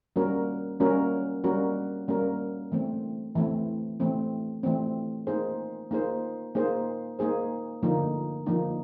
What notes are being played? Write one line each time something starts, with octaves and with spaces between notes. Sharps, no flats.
G3 A#3 C#4 F#4 A#4
G3 A#3 C#4 F#4 A#4
G3 A#3 C#4 F#4 A#4
G3 A#3 C#4 F#4 A#4
E3 A3 C4
E3 A3 C4
E3 A3 C4
E3 A3 C4
A#3 D#4 G#4 C5
A#3 D#4 G#4 C5
A#3 D#4 G#4 C5
A#3 D#4 G#4 C5
D3 F3 A#3 D#4
D3 F3 A#3 D#4